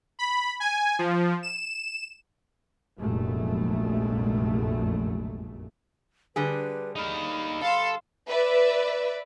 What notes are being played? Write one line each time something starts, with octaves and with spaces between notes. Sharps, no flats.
B5
G#5
F3
E7
F1 A#1 F#2 A#2 G#3 A3
D3 G3 G#4 B4
D#4 F5 B5
A4 F5 C6
B4 D5 E5